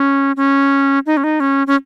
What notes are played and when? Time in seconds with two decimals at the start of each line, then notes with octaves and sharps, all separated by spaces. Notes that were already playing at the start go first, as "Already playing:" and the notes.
Already playing: C#4
0.37 C#4
1.06 D#4
1.17 C#4
1.24 D#4
1.40 C#4
1.67 C#4